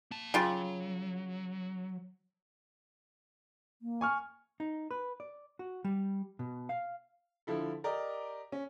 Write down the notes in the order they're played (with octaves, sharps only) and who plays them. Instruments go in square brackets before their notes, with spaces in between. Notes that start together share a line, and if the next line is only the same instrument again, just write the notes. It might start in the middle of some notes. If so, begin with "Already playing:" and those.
[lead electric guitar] A#3 A5
[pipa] C#3 F4 G4 [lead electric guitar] F#3
[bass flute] A#3
[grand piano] G#5 C#6 F6
[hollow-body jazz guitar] D#4
B4
D5
F#4
G3
B2
F5
[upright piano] D3 F3 E4 A4
G4 A#4 D5 D#5 A#5
C#4